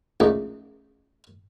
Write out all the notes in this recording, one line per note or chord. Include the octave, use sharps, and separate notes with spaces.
A#1 G#2 C#3 A3 D4 D#4